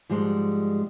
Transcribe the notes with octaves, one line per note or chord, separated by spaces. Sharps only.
G#2 F3 G3 G#3